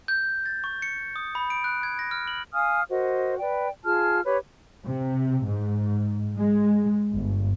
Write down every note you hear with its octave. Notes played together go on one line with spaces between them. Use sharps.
G6
A6
C#6
C#7
D#6
B5
D7
F#6
G#6
A#6
F6
F#7
F5 G#5 D#6 F6
F#4 A#4 C5 D#5
B4 D5 G5
F4 G#4 A5 F6
G4 B4 C#5
C3
G#2
G#3
G1